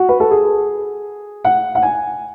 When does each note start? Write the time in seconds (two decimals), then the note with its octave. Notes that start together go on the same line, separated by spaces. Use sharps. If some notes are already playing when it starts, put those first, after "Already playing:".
Already playing: F#4
0.09 B4
0.20 A4
0.31 G#4
1.45 F#5
1.75 F#5
1.83 G#5